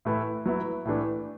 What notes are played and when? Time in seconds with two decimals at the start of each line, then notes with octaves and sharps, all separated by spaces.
0.05 A2 E3 A3 E4 B4
0.46 F#3 B3 E4
0.85 A2 E3 A3 D4